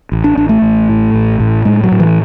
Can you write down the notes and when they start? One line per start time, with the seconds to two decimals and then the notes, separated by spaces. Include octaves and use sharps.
0.12 A1
0.24 D4
0.37 A1 D4
0.49 A3
0.62 A1
0.89 A2
1.14 A1
1.40 A2
1.65 A2 G#3
1.84 F#3
1.92 A2
2.00 E3